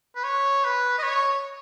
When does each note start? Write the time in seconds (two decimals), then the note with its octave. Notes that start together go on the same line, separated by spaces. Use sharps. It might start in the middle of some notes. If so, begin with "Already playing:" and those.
0.16 B4
0.24 C#5
0.64 B4
0.98 D#5
1.03 C#5